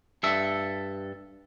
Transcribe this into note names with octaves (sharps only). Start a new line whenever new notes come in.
G2 A4 E5